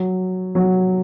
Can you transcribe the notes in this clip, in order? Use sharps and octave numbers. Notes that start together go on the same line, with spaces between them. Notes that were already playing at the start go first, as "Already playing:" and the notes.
Already playing: F#3
F#3